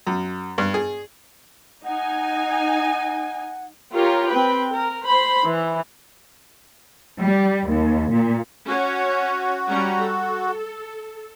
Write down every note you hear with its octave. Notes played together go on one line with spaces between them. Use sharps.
F#2
G2
G#4
D#4 F#5 G#5
F4 G4 A#4 C#5
C4 B4 G5
A#4
C5 B5 C6
E3
G3
D#2
A#2
C#4 F#4 C#5
G3 C#4 A#5
A4